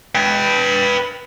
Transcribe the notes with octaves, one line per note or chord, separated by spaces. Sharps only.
B4 G5